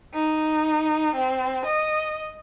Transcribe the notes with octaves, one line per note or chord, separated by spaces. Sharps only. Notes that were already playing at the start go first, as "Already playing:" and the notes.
D#4
C4
D#5